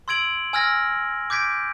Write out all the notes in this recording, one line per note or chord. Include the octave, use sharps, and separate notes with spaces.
C6 E6 G#6 D7 F#7
G#5 E6 F6 G#6 A#6
D6 G6 G#6 B6 D7